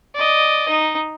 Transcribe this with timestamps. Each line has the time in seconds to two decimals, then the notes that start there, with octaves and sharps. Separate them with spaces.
0.15 D5 D#5
0.69 D#4